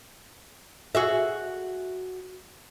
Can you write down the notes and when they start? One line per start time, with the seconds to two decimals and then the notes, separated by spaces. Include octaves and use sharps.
0.95 F#4 G#4 E5